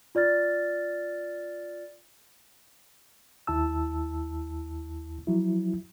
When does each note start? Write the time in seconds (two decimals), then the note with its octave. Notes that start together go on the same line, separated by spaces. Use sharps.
0.15 F4 D5 F6 A6
3.47 D#2 E4 A5 E6
5.27 F3 F#3 E4